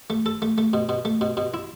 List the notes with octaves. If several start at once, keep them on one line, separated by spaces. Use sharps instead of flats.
A3
A4
A3
A3
B2
B2
A3
B2
B2
E4